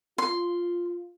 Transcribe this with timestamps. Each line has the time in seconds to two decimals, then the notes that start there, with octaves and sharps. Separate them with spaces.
0.18 F4 C6